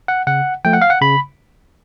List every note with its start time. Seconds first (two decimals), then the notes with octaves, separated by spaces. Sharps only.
0.08 F#5
0.27 C#3 F#5
0.65 F3 A3 G5
0.73 F#5
0.82 F5
0.90 F#5
1.01 C#3 B5